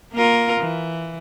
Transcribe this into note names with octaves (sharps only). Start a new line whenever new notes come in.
A#3 F4 A#4
E3